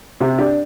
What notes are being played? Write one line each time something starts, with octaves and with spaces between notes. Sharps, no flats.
C3 G4
D4 G4